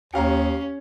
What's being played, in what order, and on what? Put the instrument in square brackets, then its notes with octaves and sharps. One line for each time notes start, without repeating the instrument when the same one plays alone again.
[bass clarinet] D#2 [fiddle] C#4 [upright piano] G4 F5 A#5